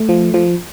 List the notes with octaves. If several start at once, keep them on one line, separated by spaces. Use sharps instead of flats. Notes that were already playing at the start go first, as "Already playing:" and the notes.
Already playing: A3
F3
F3